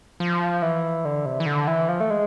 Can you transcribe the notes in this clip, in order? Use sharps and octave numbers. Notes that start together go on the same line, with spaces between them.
F3
E3
D3
C3
E3
D3
E3
F3
A3
G#3